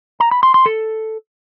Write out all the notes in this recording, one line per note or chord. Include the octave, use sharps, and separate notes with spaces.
A#5
B5
C6
C6
A4